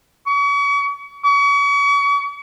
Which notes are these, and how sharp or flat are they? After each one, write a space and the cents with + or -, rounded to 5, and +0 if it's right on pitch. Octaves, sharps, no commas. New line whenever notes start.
C#6 +40
C#6 +40